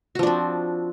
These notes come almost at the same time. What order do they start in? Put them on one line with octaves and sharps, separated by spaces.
F#4 F3 D4 C4